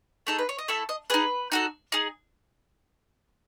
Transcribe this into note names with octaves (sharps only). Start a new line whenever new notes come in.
A3 D#4 G#4 A4
B4
C#5
D#5
A3 E4 A4 E5
D#5
D#4 G#4 B4
D#4 F#4 A4
D#4 G#4